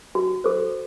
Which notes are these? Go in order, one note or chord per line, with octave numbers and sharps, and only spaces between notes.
F#4
A4 C5